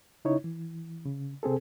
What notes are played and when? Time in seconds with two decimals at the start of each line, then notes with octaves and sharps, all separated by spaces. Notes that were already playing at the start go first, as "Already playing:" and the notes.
0.25 C#3 D#4 E4 C#5
0.44 E3
1.06 C#3
1.43 C3 C4 G#4 A4